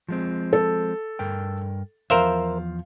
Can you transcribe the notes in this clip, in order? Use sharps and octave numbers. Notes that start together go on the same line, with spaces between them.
F3 G#3 C4
A4
G2 A#4 G5
E2 F3 A#4 C5 E5 F5